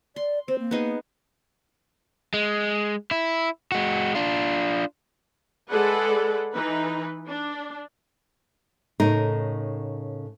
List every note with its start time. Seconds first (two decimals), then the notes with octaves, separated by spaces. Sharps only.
0.16 D5 C6
0.48 C4 C5
0.60 A#3
0.71 B3 D#4 G#4
2.34 G#3
3.11 E4
3.72 G#3 F#4
4.15 D4 F4
5.70 G#3 G#4 A4 B4 D5 F#5
6.53 E3 D#4 B4
7.27 D4
9.00 A2 C#3 D#4 A#4